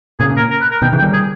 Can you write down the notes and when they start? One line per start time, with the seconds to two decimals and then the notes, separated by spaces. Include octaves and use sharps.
0.20 A#2 C#3 G#4
0.36 A#4
0.51 A#4
0.61 B4
0.71 A#4
0.82 B2 D#3 G5
0.93 C#3 E3
0.98 G5
1.02 D#3 G3
1.13 G#4